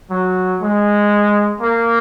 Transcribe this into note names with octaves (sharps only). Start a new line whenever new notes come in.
F#3
G#3
A#3